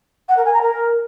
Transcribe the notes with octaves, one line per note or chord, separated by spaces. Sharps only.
F#5
A#4
G#5
A#5
A#4